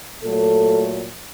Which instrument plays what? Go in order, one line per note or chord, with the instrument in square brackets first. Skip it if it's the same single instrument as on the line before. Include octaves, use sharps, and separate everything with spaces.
[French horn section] A#2 F#3 A3 A4